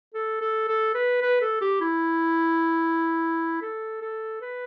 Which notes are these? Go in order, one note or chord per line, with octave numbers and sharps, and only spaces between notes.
A4
A4
A4
B4
B4
A4
G4
E4
A4
A4
B4